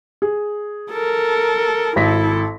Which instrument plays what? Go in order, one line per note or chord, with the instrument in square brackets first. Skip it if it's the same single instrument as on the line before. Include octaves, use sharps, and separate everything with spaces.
[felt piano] G#4
[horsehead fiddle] A4 A#4
[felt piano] G#1 A#6 B6 [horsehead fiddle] E4 A4